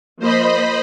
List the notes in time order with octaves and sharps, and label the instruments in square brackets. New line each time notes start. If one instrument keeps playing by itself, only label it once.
[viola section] F3 A#3 [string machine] C5 D#5 B5